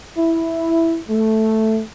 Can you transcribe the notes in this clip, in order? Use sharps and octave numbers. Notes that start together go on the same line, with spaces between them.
E4
A3